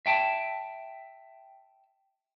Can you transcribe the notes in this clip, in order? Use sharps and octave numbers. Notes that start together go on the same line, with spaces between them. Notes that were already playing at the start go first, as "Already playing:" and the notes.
E5 G5 A5